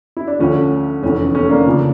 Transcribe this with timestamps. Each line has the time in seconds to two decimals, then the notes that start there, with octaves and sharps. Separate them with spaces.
0.17 E4
0.27 D4
0.39 D2 D3 F3 A3 C#4
1.03 F1 E2 E3 A3 C#4
1.35 A3 C#4
1.50 A#3 D4
1.66 C#3 F3